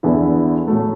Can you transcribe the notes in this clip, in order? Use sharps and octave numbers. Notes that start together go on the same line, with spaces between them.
E2 D3 B3 E4
A2 F#3 A3